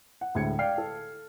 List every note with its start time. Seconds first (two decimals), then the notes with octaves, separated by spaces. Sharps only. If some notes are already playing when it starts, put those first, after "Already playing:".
0.21 F#5
0.35 D2 A2 G#3 G#6 C#7
0.58 D5 F5 G5 F6 C7
0.78 A4